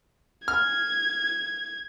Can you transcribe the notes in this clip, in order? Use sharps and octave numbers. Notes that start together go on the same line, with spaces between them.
F6 G#6